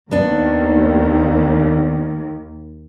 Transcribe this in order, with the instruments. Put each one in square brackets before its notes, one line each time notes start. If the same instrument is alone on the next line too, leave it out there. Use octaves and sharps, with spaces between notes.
[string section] D#2 [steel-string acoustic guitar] B3 D4